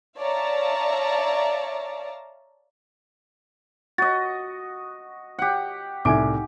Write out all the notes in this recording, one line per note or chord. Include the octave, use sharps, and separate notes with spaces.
C#5 D5 E5 F5 A5 A#5
F#4 D#5 A6
G4 F#5
C2 A2 D#4 G#5 D6 D7